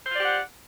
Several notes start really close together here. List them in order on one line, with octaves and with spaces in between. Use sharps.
C5 F4 D5 G4 F#5